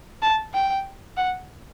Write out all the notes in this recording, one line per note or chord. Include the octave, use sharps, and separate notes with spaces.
A5
G5
F#5